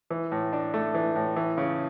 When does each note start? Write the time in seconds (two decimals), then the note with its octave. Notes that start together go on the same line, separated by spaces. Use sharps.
0.11 E3
0.32 A2
0.53 D4
0.74 A3
0.94 E3
1.16 A2
1.36 E3
1.58 C#3